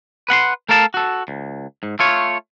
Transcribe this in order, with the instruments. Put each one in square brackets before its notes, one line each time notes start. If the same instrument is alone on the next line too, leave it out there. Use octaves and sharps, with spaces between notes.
[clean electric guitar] B4 F#5 B5 C6
A3 A4 A#4 F5 A5
F#4 A4
C#2
G#2
A3 F4 C#5